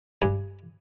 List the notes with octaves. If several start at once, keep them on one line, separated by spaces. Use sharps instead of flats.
G2 G#5